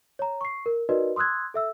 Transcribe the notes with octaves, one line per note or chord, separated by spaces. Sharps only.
C#5 A#5
C#6 C7
A#4
D#4 F#4 A#4 B4 D5 D#5
C6 D#6 E6 F#6 G#6
A4 E5 E6